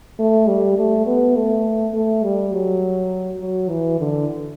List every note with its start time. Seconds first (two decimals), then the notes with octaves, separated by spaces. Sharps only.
0.19 A3
0.48 G3
0.78 A3
1.07 B3
1.36 A3
1.94 A3
2.23 G3
2.53 F#3
3.41 F#3
3.69 E3
3.99 D3